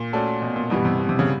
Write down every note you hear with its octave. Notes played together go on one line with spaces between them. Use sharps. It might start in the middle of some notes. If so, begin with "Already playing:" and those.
Already playing: A#2
A3 C#4 F#4 A4 D5
B2
A#2
G2 B2 E3 G3
C3
B2
C3
C#3